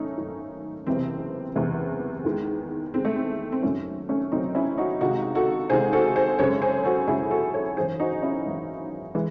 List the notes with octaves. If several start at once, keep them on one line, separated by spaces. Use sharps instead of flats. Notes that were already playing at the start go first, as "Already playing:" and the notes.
Already playing: G#1 F#2 D#3 A3 C#4 D#4
G#1 F#2 D#3
F#1 E2 C3 E3 C4
F#1 E2 C3 E3
E2 D#3 G#3
E2 D#3 G#3 C4
A3
C4
C4
F#1 F#2 D#3 F#3 A3 C#4
A3 C#4
F#1 F#2 D#3 F#3 A3 C4 D#4
C#4 E4
D#4 F#4
C#2 C3 D#3 G#3 D#4 F#4
F#4 A4
C#2 C3 D#3 G#3 G#4 C5
F#4 A4
G#4 C5
F#2 C#3 G#3 A4 C#5
G#4 C5
F#4 A4
F#2 C#3 G#3 E4 G#4
F#4 A4
A4 C#5
G#1 F#2 E3 G#4 C5
D#4 F#4
C#4 E4
G#1 F#2 E3
E3 G#3